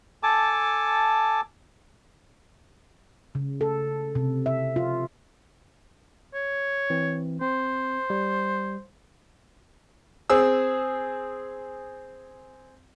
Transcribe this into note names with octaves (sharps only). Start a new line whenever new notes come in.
A4 G#5 A5 D6
C#3
A4
C3
E5
F4
C#5
E3 C4
C4 C5
G3
C4 G#4 E6